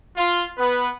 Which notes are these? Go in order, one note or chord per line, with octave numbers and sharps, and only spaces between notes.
F4
B3 B4